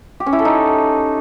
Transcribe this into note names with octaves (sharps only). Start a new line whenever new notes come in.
G4
C#4
E4
A4
D#4